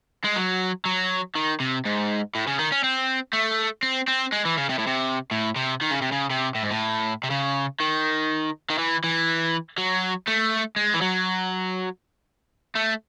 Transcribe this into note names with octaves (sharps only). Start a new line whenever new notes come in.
G#3
F#3
F#3
D#3
C3
G#2
A2
C#3
D#3
C#4
C4
A3
C4
C4
G#3
E3
C#3
C3
A2
C3
A2
C3
D#3
C#3
C3
C#3
C3
A2
G#2
A2
C3
C#3
D#3
D#3
E3
E3
F#3
A3
G#3
E3
F#3
A3